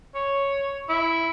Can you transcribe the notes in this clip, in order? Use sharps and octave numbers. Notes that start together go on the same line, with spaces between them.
C#5
E4